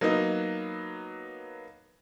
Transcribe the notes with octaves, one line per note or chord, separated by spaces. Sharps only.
F#3 A#3 B3 D#4